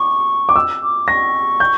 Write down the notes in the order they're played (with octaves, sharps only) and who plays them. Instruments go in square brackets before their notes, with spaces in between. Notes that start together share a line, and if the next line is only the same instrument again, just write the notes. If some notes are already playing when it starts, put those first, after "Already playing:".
Already playing: [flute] C#6 [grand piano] D6
[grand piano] D6
E6
[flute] D6
[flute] C#6 [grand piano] A#6
[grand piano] G6